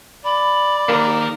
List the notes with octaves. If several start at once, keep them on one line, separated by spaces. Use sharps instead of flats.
D5 B5
D#3 A#3 A#4